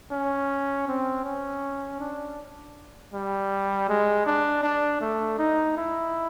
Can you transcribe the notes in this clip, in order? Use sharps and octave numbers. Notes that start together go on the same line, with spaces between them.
C#4
C4
C#4
D4
G3
G#3
D4
D4
A3
D#4
E4